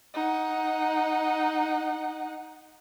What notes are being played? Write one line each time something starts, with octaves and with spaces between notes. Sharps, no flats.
D#4 F#5